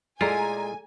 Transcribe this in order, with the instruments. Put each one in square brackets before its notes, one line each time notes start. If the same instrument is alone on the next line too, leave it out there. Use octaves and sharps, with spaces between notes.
[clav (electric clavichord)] A#2 E4 F4 [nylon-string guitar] G#3 [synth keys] A4 D5 A#5 [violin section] G#5